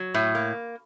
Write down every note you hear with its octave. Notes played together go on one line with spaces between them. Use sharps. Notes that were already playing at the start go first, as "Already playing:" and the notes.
Already playing: F#3
A2
A#3